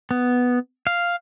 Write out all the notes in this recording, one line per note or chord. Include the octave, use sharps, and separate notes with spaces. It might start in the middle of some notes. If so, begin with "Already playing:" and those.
B3
F5